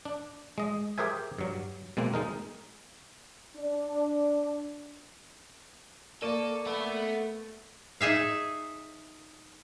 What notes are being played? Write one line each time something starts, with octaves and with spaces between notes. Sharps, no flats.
D4
G#3 D#5
G4 G#4 A#4 C5 E5 G#5
G2 F#3
B2 G#3 A#3 C4
G#3 D#4 A#4
D4
A#3 A4 D5 C#6 D6 D#7
A3 B3
D#4 G#4 E5 F5